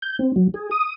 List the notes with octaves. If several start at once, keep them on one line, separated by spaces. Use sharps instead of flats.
G6
C4
F#3
G#4
D#6